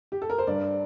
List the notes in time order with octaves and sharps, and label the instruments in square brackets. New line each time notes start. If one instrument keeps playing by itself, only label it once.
[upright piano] G4
A4
A#4
C5
G2 D5